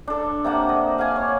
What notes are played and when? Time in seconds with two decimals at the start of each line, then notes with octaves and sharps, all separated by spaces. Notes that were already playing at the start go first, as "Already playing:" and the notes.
0.08 D4 A4
0.44 C3 A#3 F#5 A5
0.69 D#5
0.98 F5 F#5 G#5 D6
1.16 C#5